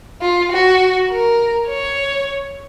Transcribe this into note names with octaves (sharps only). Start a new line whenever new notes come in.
F4
F#4
A#4
C#5